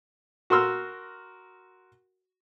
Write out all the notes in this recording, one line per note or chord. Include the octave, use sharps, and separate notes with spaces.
F#4 A#4 C6 E6 F6